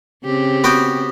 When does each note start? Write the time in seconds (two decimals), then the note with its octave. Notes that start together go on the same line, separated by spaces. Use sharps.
0.24 C#3 C4 G4
0.64 B3 F#4 G5